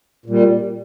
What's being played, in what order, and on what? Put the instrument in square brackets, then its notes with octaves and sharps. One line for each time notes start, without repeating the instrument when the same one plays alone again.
[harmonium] A#2 G3